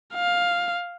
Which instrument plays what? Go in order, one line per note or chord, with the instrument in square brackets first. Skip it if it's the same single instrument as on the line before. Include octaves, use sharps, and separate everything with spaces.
[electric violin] F5